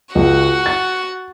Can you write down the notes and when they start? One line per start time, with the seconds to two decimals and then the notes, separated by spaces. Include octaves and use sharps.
0.15 C#2 F#4 F#5
0.66 A6